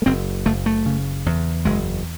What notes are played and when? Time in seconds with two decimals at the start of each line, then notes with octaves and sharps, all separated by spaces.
0.02 A3
0.06 F#1 C4
0.46 F#1 A3
0.66 A3
0.86 C#3
1.26 E2
1.65 F#1 G#3